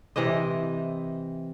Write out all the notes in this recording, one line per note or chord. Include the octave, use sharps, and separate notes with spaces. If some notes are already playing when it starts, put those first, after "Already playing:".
C3 E3 C5 D#5